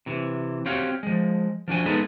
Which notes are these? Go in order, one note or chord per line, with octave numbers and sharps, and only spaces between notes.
C3 E3
C4 F#4 G4 C#5 F5
F3 G#3
F3 D4 F#4 G#5
G#3 B3 D#4 G#4 A4 B4